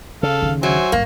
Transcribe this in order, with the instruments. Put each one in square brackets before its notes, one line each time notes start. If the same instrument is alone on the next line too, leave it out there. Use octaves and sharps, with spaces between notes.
[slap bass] C#3 [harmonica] A4 F5
[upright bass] D2 D#3
[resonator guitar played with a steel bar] F#3 [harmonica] C5 E5 G#5
[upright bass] A1 G2 [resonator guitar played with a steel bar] A#3